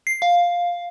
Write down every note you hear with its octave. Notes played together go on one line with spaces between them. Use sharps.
C7
F5